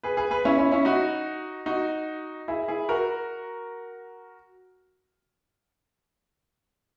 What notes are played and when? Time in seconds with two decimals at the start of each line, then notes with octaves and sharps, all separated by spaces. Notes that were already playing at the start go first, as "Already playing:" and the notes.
0.03 G#4 B4
0.17 G#4 B4
0.31 G#4 B4
0.45 C#4 E4
0.58 C#4 E4
0.72 C#4 E4
0.85 D#4 F#4
1.66 D#4 F#4
2.48 E4 G#4
2.68 E4 G#4
2.89 F#4 A#4